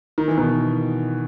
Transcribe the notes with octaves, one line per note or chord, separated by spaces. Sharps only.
D#3
E3
B2 D#3